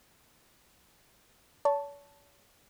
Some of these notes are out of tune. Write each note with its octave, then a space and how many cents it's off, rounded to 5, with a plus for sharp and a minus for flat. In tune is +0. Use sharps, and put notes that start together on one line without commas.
C#5 +45 A5 +0 C#6 +0